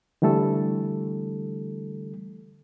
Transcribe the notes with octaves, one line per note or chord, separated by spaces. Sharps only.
D3 E3 G3 A3 A4